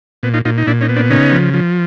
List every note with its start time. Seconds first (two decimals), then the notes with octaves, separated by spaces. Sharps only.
0.23 A#2 B3
0.34 D#4 F4
0.45 A#2 D#4 F4
0.58 D#4
0.67 A#2 D4 E4
0.81 C#4 D#4
0.89 B3
0.96 C4 D4
1.10 C#3 C#4 D#4
1.32 F3
1.54 F3